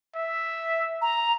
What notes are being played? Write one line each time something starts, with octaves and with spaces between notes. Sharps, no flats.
E5
A#5